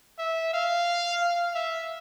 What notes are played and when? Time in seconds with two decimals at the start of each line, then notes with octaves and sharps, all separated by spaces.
0.19 E5
0.53 F5
1.22 F5
1.55 E5